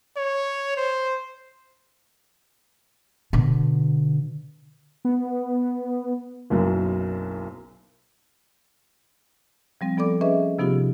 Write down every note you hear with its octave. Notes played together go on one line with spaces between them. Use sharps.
C#5
C5
B2 D3
B3
F#1 B1 F#2
F3 G3 C4
F3 B3 A4 D5 D6
C#4 G#4 B4 D#5 E5
C3 F3 B3 D#4 F4 G4